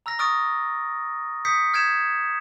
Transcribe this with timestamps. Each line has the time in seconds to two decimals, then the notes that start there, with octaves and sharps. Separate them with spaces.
0.06 A#5 E6 F6 A#6
0.19 C#6 D#6 F6 A6 D7
1.45 D#6 G6 B6 C#7
1.74 F6 G6 G#6 B6 D7 E7